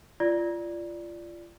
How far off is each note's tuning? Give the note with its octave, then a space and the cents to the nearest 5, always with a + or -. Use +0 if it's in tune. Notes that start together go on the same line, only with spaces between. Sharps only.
F4 -25 D5 +0